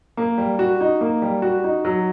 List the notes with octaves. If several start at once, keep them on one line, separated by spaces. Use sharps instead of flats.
A#3
G3
F#4
D#4
A#3
G3
F#4
D#4
F#3